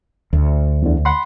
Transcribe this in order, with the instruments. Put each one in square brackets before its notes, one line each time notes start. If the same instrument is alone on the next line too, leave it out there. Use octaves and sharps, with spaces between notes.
[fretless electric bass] D2
[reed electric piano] E2 D3
F#5 B5 C6